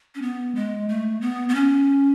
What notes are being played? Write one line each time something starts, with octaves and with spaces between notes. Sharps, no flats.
C#4
B3
G#3
A3
B3
B3
C#4